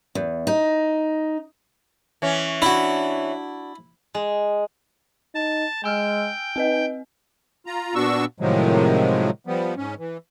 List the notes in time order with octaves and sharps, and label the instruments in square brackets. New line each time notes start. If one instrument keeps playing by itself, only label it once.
[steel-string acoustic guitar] E2
D#4
[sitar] E3 C#4
[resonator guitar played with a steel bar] D4 F#4 [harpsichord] E4
[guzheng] G#3
[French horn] D#4 [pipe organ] A5
[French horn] G#3 [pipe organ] G5 [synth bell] G#5 E6 F6
[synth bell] C4 B4 D#5 [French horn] D#4
[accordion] F4 A#5
A#2 B3 D4 F#4 C#6 E6
A2 C3 D#3 F3 F#3 G#3
F3 G3 B3
G#2 C#4
E3